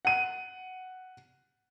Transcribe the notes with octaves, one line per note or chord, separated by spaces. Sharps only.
F#5 D#7